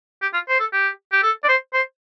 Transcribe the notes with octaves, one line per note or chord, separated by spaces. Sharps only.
G4
F4
C5
A4
G4
G4
A4
D5
C5
C5